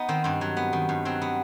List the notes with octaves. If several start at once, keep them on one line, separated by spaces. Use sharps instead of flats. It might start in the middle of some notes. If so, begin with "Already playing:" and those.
Already playing: B3 D#4
D#3 C4
G2 C4
F#3
B3
D#3
G2
F#3 C4
B3